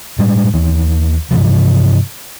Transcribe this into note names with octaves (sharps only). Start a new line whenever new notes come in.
A2 G3 G#3
D#2 E3
G2 C3 E3 F3